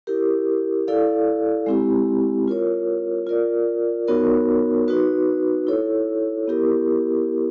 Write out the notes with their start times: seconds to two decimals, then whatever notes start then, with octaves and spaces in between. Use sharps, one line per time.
0.07 E4 G4 A#4
0.88 E4 A4 D5 F5
1.66 G#3 C4 E4 G4
2.48 F4 A#4 C#5
3.27 F4 A#4 D5
4.08 B3 D#4 F#4 A#4 C#5
4.88 D#4 F#4 B4
5.67 E4 A4 C#5
6.48 B3 E4 G4 A#4